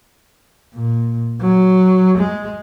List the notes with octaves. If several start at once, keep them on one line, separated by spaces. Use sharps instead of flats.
A#2
F#3
G#3